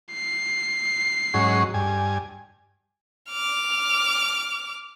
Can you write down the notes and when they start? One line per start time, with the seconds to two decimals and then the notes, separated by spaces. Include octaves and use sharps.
0.14 C7
1.34 G#2 F#3 C#4
1.74 G2 G#5
3.30 D6 F6